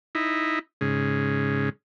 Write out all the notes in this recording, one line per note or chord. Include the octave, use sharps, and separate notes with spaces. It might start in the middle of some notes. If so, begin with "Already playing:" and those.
D#4 E4
G#2 C#3